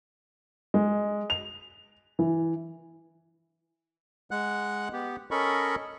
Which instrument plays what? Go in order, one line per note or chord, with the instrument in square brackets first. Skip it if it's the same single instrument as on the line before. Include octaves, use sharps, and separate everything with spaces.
[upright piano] G#3
F7
E3
[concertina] G#3 F#5 F#6
B3 G4
C#4 A4 A#4 D#5 B5 C#6